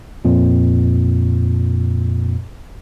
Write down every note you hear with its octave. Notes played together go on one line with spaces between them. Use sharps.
F2 A#2